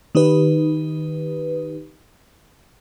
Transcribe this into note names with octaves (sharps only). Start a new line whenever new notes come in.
D#3 D#4 G4 B4